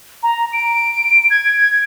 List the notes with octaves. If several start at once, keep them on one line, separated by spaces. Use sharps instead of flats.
A#5
D7
G#6